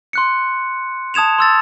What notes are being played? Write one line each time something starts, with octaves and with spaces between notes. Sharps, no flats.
C6 F#6 C#7
A5 D#6 G#6 E7 F7
C6 E6 A6